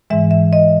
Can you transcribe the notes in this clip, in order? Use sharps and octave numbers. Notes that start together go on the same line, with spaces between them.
G#2 E3 G#3 E5
E5
D#5